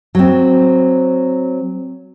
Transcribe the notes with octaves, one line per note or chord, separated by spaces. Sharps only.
F#3 C4